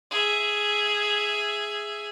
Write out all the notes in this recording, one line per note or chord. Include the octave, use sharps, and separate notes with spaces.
G#4 E5